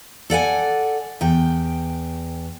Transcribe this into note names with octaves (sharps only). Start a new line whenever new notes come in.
A4 D5 F#5 G#5
E2 G5